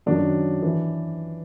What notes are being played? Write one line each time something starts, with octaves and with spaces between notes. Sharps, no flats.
F#2 D#3 F#3 D4
E3